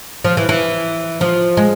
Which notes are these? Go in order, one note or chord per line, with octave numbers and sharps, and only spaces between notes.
F3
E3
E3
F3
G#3